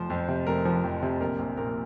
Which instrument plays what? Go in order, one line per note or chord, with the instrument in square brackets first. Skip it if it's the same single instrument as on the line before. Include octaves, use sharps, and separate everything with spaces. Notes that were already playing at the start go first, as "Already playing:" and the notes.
Already playing: [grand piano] F1 F3 C5
F2
C3
F1 A#4
F3
F2
C3
A#1 A#4
A#1
A#2 A#4